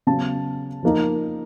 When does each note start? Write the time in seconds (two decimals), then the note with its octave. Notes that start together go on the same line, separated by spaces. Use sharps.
0.07 C#3 F#3 B3 A5
0.83 F3 A#3 D#4